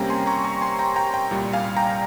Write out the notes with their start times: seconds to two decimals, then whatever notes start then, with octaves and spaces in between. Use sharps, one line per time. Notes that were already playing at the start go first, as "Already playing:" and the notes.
Already playing: C3 G3 A#3 C#4 G5 A#5
0.10 G#5 C6
0.27 A#5 C#6
0.44 A#5 C#6
0.61 G#5 C6
0.79 G5 A#5
0.96 G5 A#5
1.14 G5 A#5
1.31 C2 A#2 G3
1.53 F5 G#5
1.77 G5 A#5